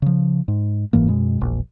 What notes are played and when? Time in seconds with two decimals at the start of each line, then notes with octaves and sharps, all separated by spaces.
0.02 C#3 F3
0.48 G#2
0.93 F#1 G#2 E3 A#3
1.08 F#2 B2 G#3
1.41 E1 A#1